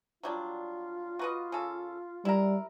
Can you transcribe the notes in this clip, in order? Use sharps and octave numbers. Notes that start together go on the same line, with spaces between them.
F#3 G3 D4 F4
F#4 B4 D#5
C#3 A4
G3 E4 A#4